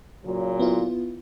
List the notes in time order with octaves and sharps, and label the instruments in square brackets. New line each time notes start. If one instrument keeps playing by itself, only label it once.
[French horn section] A#2 C#3 F#3
[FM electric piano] B3 E4 F4